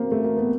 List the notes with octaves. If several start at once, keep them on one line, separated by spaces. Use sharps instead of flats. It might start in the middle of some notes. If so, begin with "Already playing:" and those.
Already playing: A#3 C4
A3
A#3
B3